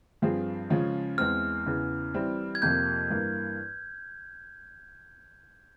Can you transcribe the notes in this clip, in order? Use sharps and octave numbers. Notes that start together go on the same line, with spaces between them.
G2 F3 C4 F4 G#4
C#3 F3 G#3 C#4 F4
E2 E3 G#3 C4 F6
E2 C#3 E3
E3 G3 C4 E4
G#6
F2 C3 F3 A#3 G6
G2 E3 A#3